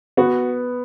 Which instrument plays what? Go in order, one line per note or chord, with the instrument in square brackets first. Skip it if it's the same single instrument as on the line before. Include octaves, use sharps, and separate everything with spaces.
[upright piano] B3 [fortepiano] F#4